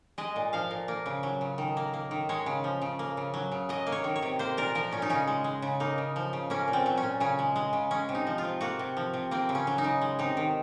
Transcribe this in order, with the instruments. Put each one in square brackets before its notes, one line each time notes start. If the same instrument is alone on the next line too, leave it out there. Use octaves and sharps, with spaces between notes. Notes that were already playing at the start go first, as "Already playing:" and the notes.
[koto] G#3 D#5
A#2
F3 F5
A#2
A#3
C#3
F#3
C#3
D#3
A#3
A#3
D#3
G#3 C#5
C#3
F3
C#3
A#3
C#3
F#3
C#3
F#3 D#5
A#3
C#5
D#3
C#5
C3
A#3 C5
A#2 A#4
F3 A#4
A#2 C#4
D#4
C#3 C#4
G#3
G#3
C#3
A#3 D#4
C#3
F3
C#3
A#3 C#4
A#2
C4
F#3
C#4
A#2
C#3 C#4
G#3
G#3
C#3
G#3 C#4
C3
D#4
F3
F4
C3
A#3 F#4
C3
F3
C3
A#3 C4
C#3
C#4
F#3
D#4
C#3
G#3
C3 D#4
D#3